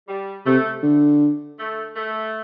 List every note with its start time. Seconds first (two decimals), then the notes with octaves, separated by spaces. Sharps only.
0.08 G3
0.46 C3 A3
0.83 D3
1.59 A3
1.96 A3